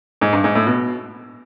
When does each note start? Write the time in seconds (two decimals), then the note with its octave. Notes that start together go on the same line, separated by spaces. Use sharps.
0.21 G#2
0.33 G2
0.44 G#2
0.55 A2
0.66 B2